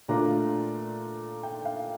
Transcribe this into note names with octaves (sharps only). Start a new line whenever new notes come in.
A#2 A3 D4 F4 A#5
G5
F5